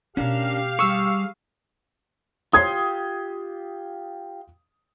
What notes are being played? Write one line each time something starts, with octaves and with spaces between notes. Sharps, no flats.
B2 A3 C#4 D4 G4 A#4 F5
G3 G#4 C#6 E6
F4 G4 C6 D#6 G#6